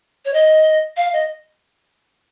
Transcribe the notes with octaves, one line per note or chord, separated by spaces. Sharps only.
C#5
D#5
F5
D#5